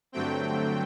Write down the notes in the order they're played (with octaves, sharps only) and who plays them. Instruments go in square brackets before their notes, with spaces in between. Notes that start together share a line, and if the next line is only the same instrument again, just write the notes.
[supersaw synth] G2 D3 F#3 A3 C4 G5